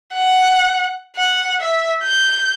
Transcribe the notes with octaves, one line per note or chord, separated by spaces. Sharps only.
F#5
F#5
E5
G6